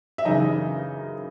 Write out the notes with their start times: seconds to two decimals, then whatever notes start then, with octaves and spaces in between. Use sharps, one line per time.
0.18 E5
0.25 F#2 C#3 E3 D#4 D#5